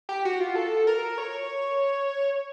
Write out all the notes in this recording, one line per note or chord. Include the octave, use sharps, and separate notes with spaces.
G4
F#4
F4
A4
A#4
C#5